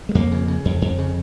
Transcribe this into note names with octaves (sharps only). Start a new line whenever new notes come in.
G#3
F2 A#3
C#3
C#3
F2
F2
C#3